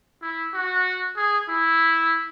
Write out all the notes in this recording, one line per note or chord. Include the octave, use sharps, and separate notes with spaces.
E4
F#4
G#4
E4